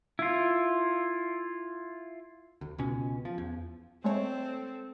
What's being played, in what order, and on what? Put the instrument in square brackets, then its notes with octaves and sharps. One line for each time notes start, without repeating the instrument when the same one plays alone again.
[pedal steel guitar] E4 F4
[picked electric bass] D2
C#2 B2 C#4
F3
E2
[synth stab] G#3 A3 C#5 [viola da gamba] C4 A4